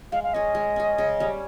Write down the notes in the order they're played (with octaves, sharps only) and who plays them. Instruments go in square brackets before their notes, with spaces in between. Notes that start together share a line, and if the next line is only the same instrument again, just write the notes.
[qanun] G#3 [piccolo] F5
[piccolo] F5
[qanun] C#4 G#4 [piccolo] D#5
[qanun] G#3
C#4 G#4
C#3
G3 C#4